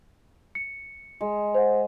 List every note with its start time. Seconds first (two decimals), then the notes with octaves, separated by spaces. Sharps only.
0.55 C#7
1.21 G#3
1.55 C5 F#5